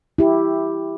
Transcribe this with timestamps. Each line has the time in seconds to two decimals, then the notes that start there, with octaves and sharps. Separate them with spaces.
0.18 E4 G4